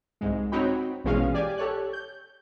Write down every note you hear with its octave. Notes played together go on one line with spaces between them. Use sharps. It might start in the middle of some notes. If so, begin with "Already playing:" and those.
C2 G#2 G#3
C4 D#4 F#4 C#5 G5 B5
A#1 B2 E3 G#3 C#4 F5
G4 D5 G#5
G4 A4 C#5 F#6
G6